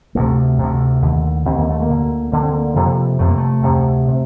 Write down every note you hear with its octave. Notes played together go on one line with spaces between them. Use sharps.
D2 C3 A3
D2 C3
D#2 D3
D#2 D3 C4
A#3
A3
A#3
D2 D3
D2 D3 A#3
C4
A#3
F2 C3
F2 C3 A3
A#3
A3
D2 C3
C3